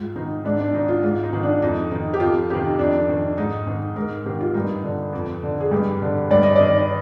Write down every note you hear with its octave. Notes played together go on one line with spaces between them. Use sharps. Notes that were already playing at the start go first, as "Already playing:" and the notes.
Already playing: G#2 F4
D#3 D#4
G#2 D4
D4
D#3 D#4
F4
G#2 F4
D#4
D#3
D4
F2 D#4
D#3 D#4
G4
F2 F4
C3 D#3 G4
F2 D4
D#3
G#2 D#4
D#3
G#2 A#4
D#3 G4
F4
G2 D#4
D3
F2
D3
G#4
G2 G4
D3
G2 D5
D#5
D#3 D5